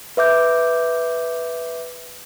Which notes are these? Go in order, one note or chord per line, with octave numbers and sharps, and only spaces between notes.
B4 E5 D6 G6